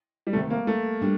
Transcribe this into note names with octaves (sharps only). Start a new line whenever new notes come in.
G3
D2 C3 D#3 A3
A#3
A3
G3 D4